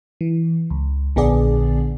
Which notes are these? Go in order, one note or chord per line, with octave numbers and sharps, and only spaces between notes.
E3
C#2
A#1 D3 B3 D4 G#4 D5